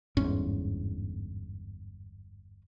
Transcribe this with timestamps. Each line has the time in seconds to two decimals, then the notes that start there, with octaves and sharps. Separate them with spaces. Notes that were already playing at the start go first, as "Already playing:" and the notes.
0.17 G1 E2 G#2 C#4